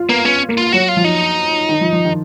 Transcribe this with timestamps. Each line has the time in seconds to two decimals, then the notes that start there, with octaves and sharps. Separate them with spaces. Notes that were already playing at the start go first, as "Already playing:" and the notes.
Already playing: F4
0.09 A#3 B3
0.25 B3 C#4
0.49 A#3
0.57 F4
0.72 F#3 F#4
0.89 F4
0.97 F3
1.04 D#4
1.69 D#3
1.81 F3
1.93 F3
2.05 D#3